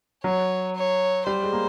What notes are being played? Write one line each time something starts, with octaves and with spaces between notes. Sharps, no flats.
F#3 C#5
C#5
G3 C5
G#3
A#3